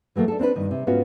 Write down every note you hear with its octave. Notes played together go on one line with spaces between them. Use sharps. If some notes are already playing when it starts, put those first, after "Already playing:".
E3 F#3 A3 A#3
D4 A4
C4 D4 E4 B4
G2 D#3
C3
G#2 B3 C#4 F4 F#4